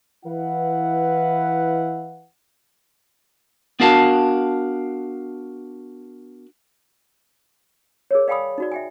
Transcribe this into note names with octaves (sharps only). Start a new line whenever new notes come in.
E3 E4 B4 F5 F#5
B3 D4 F#4 A#4 F5 A5
G#4 A#4 C#5
D5 F5 G5 G#5 B5 D#6
D#4 F#4 D5
E5 G5 G#5